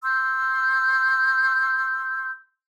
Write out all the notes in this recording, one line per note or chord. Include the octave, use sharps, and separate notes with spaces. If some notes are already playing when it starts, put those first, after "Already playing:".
C6 E6 G6